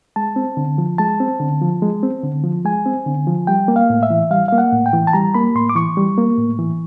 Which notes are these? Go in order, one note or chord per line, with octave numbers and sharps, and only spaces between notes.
G#3 A5
C4
D3
F3
G#3 A5
C4
D3
F3
G#3
C4
D3
F3
G#3 G#5
C4
D3
F3
G3 G5
A#3
F5
A2
E5
E3
G3 F5
A#3 F5
F#5
A2
G5
E3
A5
G3 A#5
A#3 B5
A2 C6
D6
E3 C#6
G3
A#3
A2
E3